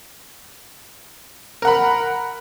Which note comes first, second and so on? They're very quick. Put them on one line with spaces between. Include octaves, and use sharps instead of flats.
A#4 F#5 B5